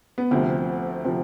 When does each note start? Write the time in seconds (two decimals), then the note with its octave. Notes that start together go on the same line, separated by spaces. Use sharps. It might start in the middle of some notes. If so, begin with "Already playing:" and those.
0.18 B3
0.31 D2 C3 F3 C4
1.05 C3 F3 C4